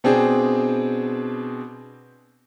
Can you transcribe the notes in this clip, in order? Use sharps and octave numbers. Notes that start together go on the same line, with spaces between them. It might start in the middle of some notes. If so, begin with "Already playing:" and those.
B2 C4 D4 G#4